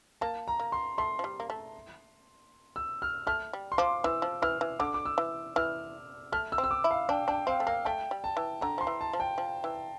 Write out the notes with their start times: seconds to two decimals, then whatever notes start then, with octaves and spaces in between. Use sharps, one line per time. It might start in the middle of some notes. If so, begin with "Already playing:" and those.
0.21 A#3 A5
0.48 A#5
0.60 A#3
0.72 C6
0.98 A3 C6
1.19 F3
1.24 G3
1.40 A#3
1.50 A3
2.76 E6
3.02 F6
3.27 A3 F6
3.53 G3
3.72 C6
3.78 F3 D6
4.04 E3 E6
4.22 F3
4.42 E3 F6
4.61 E3
4.79 D3 D6
4.94 D6
5.05 E6
5.18 E3
5.56 E3 F6
6.32 A3 F6
6.52 E6
6.58 C4
6.64 E6
6.71 D6
6.84 E4
6.91 F5
7.09 D4 G5
7.28 D4 G5
7.47 C4 F5
7.60 A3
7.67 A#3 F5
7.85 A3 G5
8.11 G3
8.24 A5
8.37 E3
8.61 D3 A#5
8.78 F3 C6
8.87 E3
9.01 A5
9.13 F3
9.20 G5
9.38 F3
9.64 E3